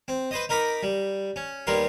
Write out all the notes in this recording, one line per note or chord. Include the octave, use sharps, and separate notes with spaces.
C4
B4 C5 D#5
D#4 A#4 A#5 B5 D6
G3
C#4
D#2 G3 B3 A#4 C6